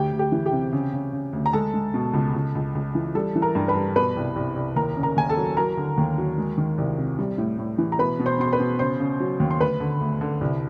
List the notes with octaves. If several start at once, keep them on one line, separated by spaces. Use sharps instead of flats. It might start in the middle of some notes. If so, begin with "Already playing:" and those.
Already playing: D2 G4 G5
D2
G4 G5
E3
G4 G5
C3
C#3
C#3
C#3
D2
A#5
G#3 A4 A5
G#3
B2
C#2
C#2
C#2
C#2
E3
G3 A4 A5
E3
A#4 A#5
G2
B4 B5
G3
B2 B4 B5
C2
C2
C2
D#2 A#4 A#5
C#3
A#4 A#5
D#2 G#5
A4 A5
F#3
F#3 A#4 A#5
D3
D#2
F#3
G#3
D#3
C2
C3
G3
A2
A2
E3
A#5
B2 B4 B5
B2
C5 C6
B2 C6
B4 B5
B2
C#3 C5 C6
C#3
F#3
D#2
C6
D2 B4 B5
D3
D2
D3
C2